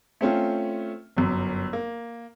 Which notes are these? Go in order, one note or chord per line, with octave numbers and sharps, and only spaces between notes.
A3 C4 C#4 F4
G1 F#2
A#3